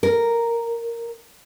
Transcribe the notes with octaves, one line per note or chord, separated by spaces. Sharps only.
A#4